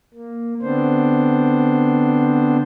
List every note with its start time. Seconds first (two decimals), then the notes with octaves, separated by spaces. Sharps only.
0.14 A#3
0.62 D3 B3 C4 D4 C5